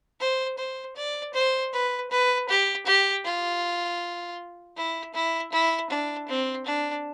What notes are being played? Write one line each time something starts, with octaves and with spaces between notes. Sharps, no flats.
C5
C5
D5
C5
B4
B4
G4
G4
F4
E4
E4
E4
D4
C4
D4